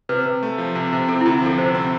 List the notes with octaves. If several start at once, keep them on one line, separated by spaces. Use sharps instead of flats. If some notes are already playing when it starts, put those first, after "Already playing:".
C3 B4
C3
A3
F3
C3
C3
C4 A4
D2 E4
F3 A4
C3 C5
C4